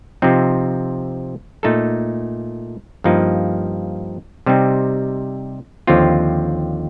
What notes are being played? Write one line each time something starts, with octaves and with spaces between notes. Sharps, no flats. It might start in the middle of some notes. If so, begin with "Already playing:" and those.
C3 F3 C4 D#4
A#2 A3 D#4 A4
G2 F3 A#3 D#4
C3 G3 C4 D#4
D#2 D3 F3 C4 F4